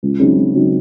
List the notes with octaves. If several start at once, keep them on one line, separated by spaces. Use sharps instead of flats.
C#2
C#3 F#3 C4 D#4
C#2
C#3 F#3 C4 D#4